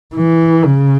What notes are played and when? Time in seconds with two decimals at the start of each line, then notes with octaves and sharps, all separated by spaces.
0.15 E3
0.65 C#3